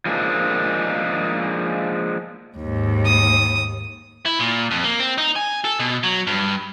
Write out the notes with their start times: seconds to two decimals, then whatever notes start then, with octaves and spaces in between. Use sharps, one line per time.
0.06 F3 G#3 A#3 D4 D#4
2.58 D#2 G#2
3.06 D#6
4.26 E4
4.39 A#2
4.71 F2
4.84 A#3
5.00 C4
5.18 D#4
5.36 G#5
5.65 A4
5.80 B2
6.03 F#3
6.27 G2